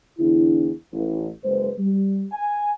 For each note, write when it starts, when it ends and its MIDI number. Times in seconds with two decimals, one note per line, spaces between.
0.19 0.71 40
0.19 0.71 50
0.19 0.71 62
0.19 0.71 64
0.92 1.28 33
1.44 1.70 30
1.44 1.70 56
1.44 1.70 71
1.44 1.70 72
1.79 2.23 55
2.32 2.69 80